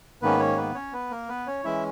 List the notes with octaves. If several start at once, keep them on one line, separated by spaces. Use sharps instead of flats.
G#2 D#3 A#3 B3 C#4 B4
C#4 C#5
B3 B4
C#4 C#5
B3 B4
A#3 A#4
B3 B4
C#4 C#5
E3 G#3 C#4 E4 E5